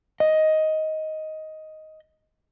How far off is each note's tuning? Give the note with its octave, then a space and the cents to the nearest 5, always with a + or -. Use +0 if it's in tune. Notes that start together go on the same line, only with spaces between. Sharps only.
D#5 +10